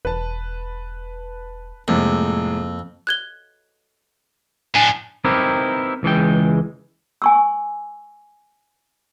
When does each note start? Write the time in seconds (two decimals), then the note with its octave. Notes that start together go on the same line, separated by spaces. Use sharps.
0.05 E1 B4 A5
1.88 F2 A2 C3 G#3 A#3
3.07 F#6 G#6 G7
4.75 A2 D4 G#5
5.25 C4 D#4 E4 G4 A#4 B4
6.03 C#2 E3 G#3 G5
7.22 G#5 C#6 E6